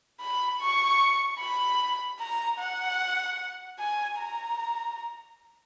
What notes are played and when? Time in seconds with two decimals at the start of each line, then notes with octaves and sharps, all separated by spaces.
0.21 B5
0.60 C#6
1.40 B5
2.20 A#5
2.60 F#5
3.79 G#5
4.19 A#5